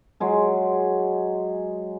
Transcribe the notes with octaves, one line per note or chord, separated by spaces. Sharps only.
F#3 G#3 G#4